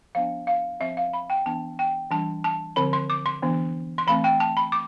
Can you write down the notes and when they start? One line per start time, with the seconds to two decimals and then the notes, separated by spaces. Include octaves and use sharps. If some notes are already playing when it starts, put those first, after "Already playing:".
0.15 F3 B3 D4 F5
0.47 F5
0.80 F3 C4 E5
0.97 F5
1.13 B5
1.30 G5
1.46 E3 B3 D4 A5
1.79 G5
2.11 E3 G3 D4 A5
2.44 A5
2.76 D3 F3 C4 B5
2.93 C6
3.10 D6
3.26 C6
3.42 E3 B3 D4
3.98 C6
4.07 E3 A3 C4 B5
4.24 G5
4.40 A5
4.57 B5
4.72 D6